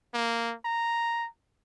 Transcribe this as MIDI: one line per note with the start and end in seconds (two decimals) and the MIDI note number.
0.14 0.55 58
0.65 1.27 82